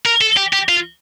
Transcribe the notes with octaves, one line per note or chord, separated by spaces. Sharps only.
A#4
A4
G4
G4
F4